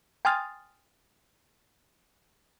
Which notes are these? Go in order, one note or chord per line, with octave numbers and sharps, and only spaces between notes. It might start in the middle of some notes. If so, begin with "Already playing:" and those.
G5 G#5 C6 D#6 F6 A6